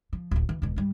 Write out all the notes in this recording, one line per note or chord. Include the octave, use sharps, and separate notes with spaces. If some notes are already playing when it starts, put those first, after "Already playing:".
F3
D1 A1
E3
E1 B2
G#2 G3